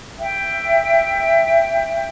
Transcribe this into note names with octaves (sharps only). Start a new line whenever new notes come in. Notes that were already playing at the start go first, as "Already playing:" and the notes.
E5 G5